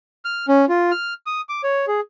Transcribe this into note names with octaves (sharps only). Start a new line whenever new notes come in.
F6
C#4
F4
F6
D#6
D6
C#5
G#4